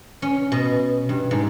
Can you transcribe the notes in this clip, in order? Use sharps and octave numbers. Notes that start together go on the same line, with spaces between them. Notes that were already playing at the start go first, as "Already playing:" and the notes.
C#4
B2
G2
G#2